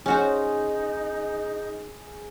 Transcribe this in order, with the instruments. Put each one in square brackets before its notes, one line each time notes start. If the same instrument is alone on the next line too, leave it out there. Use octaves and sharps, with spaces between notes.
[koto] C#4 F#4 C5 [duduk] D#4 [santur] G#4